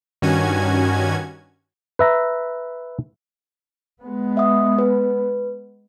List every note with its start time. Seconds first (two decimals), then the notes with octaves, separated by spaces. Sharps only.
0.22 G2 D#3 C#4 F#4 G#5 G#6
1.99 B4 E5 A#5
4.02 G#3 B3
4.37 E5 F#5 D#6
4.78 B4